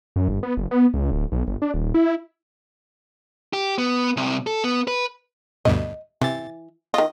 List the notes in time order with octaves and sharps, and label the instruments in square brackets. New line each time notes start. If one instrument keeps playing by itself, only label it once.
[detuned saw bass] F#2
G1
B3
F#1
B3
C#2
D1
B1
G1
D4
D#1
E4
[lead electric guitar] G4
B3
C2 C3
A4
B3
B4
[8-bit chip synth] D2 G2 B2 [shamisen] D#5
[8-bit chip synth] C3 A6 [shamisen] E3
[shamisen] D#3 F4 [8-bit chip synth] D#5